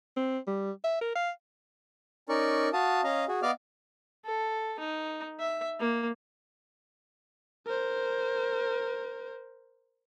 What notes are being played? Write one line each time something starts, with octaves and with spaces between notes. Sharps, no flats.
C4
G3
E5
A#4
F5
C#4 D#4 A#4 D5 C#6
F#4 F5 A5 D#6
C#4 D#5 F5 A#5
F#4 G#4
B3 D5 D#5 F5 D6 F6
A4
D#4
E5
A#3
A#4 C5